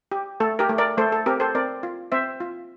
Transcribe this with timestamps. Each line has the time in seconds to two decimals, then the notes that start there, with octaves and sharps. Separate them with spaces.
0.12 G4
0.40 A3 A4
0.59 G4 A#4
0.69 A3
0.78 A#4 D5
0.98 A3 A4 C5
1.12 A4
1.26 C4 G4 A#4
1.40 A4 C5
1.55 C4 A#4 D5
1.83 F4
2.12 C4 C5 E5
2.40 F4